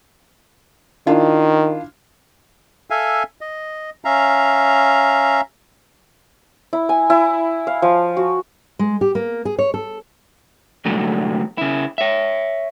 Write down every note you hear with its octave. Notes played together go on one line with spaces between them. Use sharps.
D#3 D4 E4 F4
A4 E5 F5 G#5
D#5
C#4 E5 F5 A#5
E4
G#5
E4
F5
F3
F#4
G#3
G4
A#3
G#4
C#5
A4
C2 G#2 D3 F#3 G3 A3
C#3 E4
C#5 E5